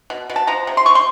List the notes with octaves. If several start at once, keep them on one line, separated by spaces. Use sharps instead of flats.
B2
B2
A5
F3 A#5
C3
C6
F3 C#6
C6